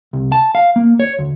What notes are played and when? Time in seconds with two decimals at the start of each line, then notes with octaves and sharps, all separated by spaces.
0.13 C2
0.32 A5
0.55 F5
0.76 A#3
1.00 C#5
1.19 D2